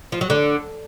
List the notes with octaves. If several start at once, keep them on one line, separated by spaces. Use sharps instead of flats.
F3
F#3
D3